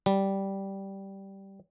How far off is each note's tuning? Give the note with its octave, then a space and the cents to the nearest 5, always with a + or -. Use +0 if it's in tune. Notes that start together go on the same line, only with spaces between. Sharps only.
G3 -10